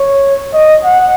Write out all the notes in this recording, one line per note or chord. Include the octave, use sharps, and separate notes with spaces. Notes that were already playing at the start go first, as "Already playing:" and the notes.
Already playing: C#5
D#5
F#5